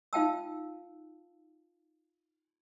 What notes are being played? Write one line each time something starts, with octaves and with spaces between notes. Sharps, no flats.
D#4 F4 F5 G5 A5 E6